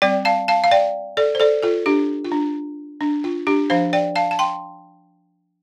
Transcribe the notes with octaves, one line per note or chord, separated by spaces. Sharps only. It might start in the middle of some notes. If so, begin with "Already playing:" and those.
G3 C4 D5 G5
F5 A5
F5 A5
F5
D5 G5
A4 D5
C5
A4 D5
F4 A4
D4 G4
F4
D4
D4
F4
D4 G4
F3 D4 C5 F5
D5 G5
F5 A5
A5
G5 C6